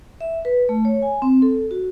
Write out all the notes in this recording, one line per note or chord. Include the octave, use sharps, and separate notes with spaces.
E5
B4
A3
C#5
G#5
C4
A4
F#4